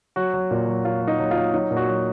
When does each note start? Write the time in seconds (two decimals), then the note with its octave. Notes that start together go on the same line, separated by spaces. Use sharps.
0.16 F#3 F#4
0.34 F#3
0.51 A#2
0.67 F#3
0.84 F#3 F4
1.02 F#3
1.08 D#4
1.19 F#3
1.31 F4
1.36 F#3
1.53 F#3 D#4
1.71 A#2
1.76 F#4
1.88 F#3